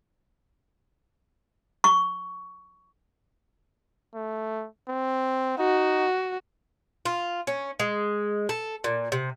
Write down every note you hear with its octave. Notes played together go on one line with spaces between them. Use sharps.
C#6
A3
C4
D#4 F#4
F4
C#4
G#3
A4
A#2
C3